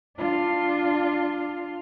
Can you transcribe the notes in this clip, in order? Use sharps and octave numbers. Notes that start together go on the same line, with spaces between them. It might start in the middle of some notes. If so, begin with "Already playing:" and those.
D4 F4